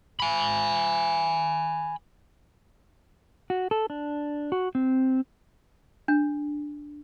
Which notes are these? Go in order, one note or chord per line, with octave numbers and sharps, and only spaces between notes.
G#5 B5
F#4
A4
D4
F#4
C4
D4